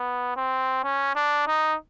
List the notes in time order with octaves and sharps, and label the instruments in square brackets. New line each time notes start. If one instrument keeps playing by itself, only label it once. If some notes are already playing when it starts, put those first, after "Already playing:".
Already playing: [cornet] B3
C4
C#4
D4
D#4